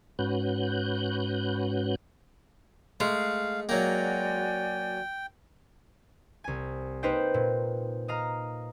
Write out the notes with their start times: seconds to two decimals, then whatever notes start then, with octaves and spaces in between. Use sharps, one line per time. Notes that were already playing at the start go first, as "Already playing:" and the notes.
0.19 G#2 C#4 F#4 B4 F#6 G6
3.00 G#3 A3 F5
3.69 F#3 A#3 F#4 D5 G5 G#5
6.44 C2 G#5
7.03 A#3 D#4 B4 C5 D#5 G5
7.34 A#2
8.08 D#5 F5 A#5